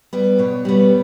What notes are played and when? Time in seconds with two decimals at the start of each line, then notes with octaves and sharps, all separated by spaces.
0.13 G3 B3
0.38 B2 C#5
0.65 G3 B3